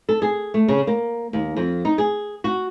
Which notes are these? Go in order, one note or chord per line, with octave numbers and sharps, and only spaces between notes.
A4
G#4
A3
C#3
A#3
D#2
F2
D#4
G#4
F#4